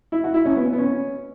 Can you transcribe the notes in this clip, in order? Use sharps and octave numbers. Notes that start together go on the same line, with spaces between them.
E4
F#4
E4
C#4
B3
B3
C#4